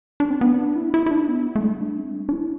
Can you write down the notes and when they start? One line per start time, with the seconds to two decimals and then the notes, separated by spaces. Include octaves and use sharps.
0.20 D4
0.30 C4
0.41 B3
0.58 D4
0.76 E4
0.94 E4
1.06 E4
1.11 D4
1.28 B3
1.56 A3
1.63 G3
1.81 D4
1.98 C4
2.15 D4
2.29 D4
2.33 E4